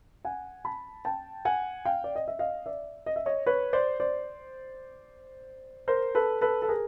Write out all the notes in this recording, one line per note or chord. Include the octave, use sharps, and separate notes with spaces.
F#5 G#5
A5 B5
G5 A5
F#5 G#5
F5 G5
D5
D#5
E5
D#5 F5
D5 E5
D#5
E5
C#5 D#5
B4 C#5
C5 D5
C5 D5
A#4 C5
A4 B4
A4 B4
A4
G#4 A#4